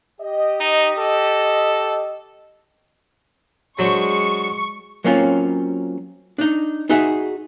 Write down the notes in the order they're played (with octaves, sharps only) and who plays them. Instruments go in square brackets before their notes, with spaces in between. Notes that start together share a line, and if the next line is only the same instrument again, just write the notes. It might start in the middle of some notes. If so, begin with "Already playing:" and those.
[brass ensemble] G4 D#5
[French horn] D#4
A4
[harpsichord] F#3 D4 C5 [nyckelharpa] G#3 [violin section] C#6
[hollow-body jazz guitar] F#3 A#3 C4 C#4 F4
D4 D#4
D#4 F#4 G#4 E5